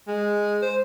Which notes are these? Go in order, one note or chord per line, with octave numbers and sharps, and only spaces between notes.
G#3
C5